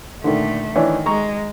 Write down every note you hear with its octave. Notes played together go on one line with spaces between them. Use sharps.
A#2 D3 D#3 A3
D#3 E3 D4 C#5
G#3 A#5 C#6